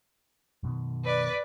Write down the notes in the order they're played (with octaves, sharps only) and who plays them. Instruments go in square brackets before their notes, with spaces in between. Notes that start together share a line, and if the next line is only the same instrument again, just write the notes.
[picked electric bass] F#2 B2 D#3
[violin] B4 D5